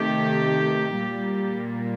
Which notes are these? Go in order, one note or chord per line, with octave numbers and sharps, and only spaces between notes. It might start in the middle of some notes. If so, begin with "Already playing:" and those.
Already playing: C3 D#3 A3 G4
A#2 G3 A#3